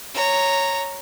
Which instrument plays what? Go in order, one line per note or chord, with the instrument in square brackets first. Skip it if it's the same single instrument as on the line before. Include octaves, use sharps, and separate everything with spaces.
[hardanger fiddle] C#5 A#5